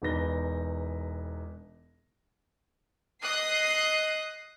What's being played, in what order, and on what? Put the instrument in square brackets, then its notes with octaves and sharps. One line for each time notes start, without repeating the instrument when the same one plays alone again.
[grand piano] E1 E2 D#4 B4 A#6 G7
[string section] D#5 D#6 F#6 C7